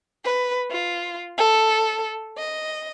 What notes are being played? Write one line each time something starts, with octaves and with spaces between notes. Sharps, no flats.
B4
F4
A4
D#5